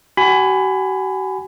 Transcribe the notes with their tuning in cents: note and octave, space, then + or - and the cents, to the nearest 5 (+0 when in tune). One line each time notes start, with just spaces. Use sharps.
F#4 +45 G#5 +0 B5 +25